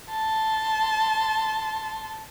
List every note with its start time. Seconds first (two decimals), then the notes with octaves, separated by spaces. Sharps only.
0.10 A5 C6